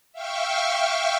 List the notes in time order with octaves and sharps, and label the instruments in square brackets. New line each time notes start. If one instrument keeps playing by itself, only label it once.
[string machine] E5 F5 G5 C#6 F6